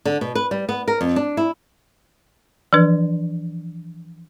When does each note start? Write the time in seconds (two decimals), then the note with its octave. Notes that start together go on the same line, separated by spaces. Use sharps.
0.05 D3
0.21 B2
0.35 B4
0.51 G3
0.69 B3
0.88 A#4
1.01 F2
1.16 D4
1.37 E4
2.73 E3 F3 D4 B4